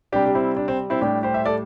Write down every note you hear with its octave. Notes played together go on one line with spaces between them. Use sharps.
C3 G3 D4 G4
G4
C4 E4
D4
C4
C4 E4
A2 G3 D4 G4
G4 C5
E5
A4 D5